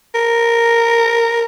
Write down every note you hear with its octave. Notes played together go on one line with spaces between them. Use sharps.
A#4